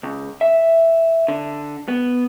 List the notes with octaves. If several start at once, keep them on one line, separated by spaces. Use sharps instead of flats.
C#2
E5
D3
B3